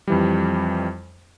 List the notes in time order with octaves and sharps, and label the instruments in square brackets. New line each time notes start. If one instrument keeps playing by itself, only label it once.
[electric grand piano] F2 E3 G3